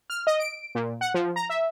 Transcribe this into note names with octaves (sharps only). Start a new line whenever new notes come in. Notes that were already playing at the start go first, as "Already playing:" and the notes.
F6
D#5
D7
A#2
F#5
F3
A#5
E5